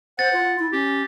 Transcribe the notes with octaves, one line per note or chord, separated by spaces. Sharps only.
C5 F#5 A6
F4
E4
C#4 G4